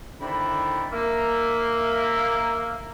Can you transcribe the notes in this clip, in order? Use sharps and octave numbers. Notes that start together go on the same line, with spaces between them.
D3 D#3 C4 E4 D5 B5
A#3 E5